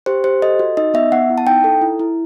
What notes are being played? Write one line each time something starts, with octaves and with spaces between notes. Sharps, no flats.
G4 C5
G4 C5
A4 D#5
F#4
D#4 D#5
B3 E5
B3 F#5
E4
A5
D#4 G5
A4
E4
E4